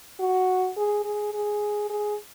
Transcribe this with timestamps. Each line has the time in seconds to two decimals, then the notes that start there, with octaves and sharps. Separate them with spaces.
0.20 F#4
0.77 G#4
1.04 G#4
1.34 G#4
1.90 G#4